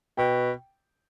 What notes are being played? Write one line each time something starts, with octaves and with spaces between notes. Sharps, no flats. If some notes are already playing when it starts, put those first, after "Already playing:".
B2 G5